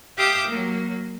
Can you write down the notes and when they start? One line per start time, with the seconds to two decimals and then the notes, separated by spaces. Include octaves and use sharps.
0.18 G4 E5 F5 G5 D6 D#6
0.47 F#3 A#3